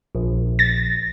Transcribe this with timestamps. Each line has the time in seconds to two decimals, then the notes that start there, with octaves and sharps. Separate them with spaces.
0.15 A#1
0.59 A6 A#6